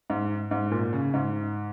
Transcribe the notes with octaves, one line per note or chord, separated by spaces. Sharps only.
G#2
G#2
A#2
C#3
G#2